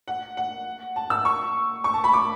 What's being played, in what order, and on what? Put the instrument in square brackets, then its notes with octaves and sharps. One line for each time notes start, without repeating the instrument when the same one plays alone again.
[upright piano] F#5
F#5
A5
E6
C#6
C#6
A5
B5
D6